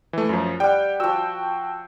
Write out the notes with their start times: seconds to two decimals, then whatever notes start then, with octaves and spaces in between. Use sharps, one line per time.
0.13 E3 A3
0.29 F#2 F3
0.60 G3 F#5 G5
1.00 F3 F#4 G5 E6